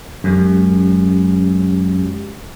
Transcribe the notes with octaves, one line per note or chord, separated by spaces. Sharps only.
F#2 G#3 C#4 G4